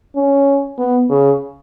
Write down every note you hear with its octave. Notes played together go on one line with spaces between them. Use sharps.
C#4
B3
C#3